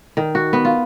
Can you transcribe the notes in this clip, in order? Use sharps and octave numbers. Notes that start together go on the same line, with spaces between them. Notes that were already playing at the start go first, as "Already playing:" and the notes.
D#3
F#4
B3
F4